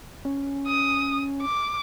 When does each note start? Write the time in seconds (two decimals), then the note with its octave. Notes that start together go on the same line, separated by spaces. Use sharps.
0.25 C#4
0.67 D#6
1.42 D6